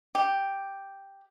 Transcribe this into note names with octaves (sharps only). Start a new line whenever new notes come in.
G4